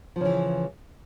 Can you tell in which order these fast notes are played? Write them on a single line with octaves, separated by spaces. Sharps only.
F3 C#3 E3